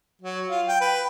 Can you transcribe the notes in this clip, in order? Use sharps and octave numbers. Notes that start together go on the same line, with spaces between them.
F#3
F4
G5
B4